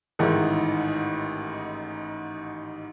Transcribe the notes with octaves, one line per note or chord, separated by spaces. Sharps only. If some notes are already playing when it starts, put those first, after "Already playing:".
A1 G#2 D#3 E4